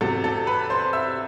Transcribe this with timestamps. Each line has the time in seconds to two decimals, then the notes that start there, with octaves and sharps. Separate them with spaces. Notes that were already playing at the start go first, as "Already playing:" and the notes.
0.01 E2 C3 F#3 A4 A5
0.24 A4 A5
0.47 B4 B5
0.70 C5 C6
0.93 E5 E6